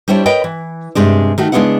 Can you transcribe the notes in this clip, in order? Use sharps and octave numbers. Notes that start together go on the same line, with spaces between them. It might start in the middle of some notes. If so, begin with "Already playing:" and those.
G3 D4 E4 C5 C#5
A#4 B4 C#5 D#5 G5
E3
G2 C3 G#3 D4
D#3 A3 F#4
C#3 G#3 B3 D4 E4 F#5